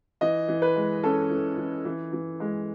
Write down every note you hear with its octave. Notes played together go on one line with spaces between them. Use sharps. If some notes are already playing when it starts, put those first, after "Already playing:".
E3 D#5
E3
B4
G#3
C#4 A4
E3
E3
E3
E3
G#3